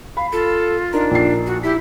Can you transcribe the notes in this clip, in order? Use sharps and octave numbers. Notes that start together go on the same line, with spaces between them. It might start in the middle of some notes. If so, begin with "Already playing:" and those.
F5 B5
F4 A4
D4 D#4 A#4 A#5
A#1 C7
F#4
E4 G4 B6